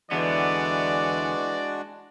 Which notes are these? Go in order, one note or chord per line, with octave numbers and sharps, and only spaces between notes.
E2 D3 E3 G#3 B3 D4 F#4 D5